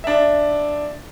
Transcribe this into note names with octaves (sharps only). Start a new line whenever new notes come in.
D4 E5